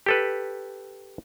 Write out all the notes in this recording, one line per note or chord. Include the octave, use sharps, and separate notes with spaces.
G4 A4 B4